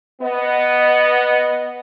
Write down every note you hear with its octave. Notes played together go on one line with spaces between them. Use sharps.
B3 D#5